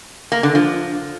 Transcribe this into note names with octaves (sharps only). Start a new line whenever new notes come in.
A#3
D3
F3